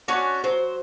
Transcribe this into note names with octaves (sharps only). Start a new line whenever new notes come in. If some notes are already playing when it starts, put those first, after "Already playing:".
C#4 D4 F#4 C#5
F#3 C5